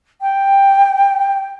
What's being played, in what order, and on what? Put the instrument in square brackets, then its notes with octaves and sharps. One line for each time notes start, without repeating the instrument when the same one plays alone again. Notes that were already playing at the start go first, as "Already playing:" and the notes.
[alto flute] G5